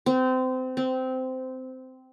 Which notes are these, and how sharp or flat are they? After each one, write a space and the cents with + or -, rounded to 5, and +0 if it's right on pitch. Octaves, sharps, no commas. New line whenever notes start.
C4 -25
C4 -15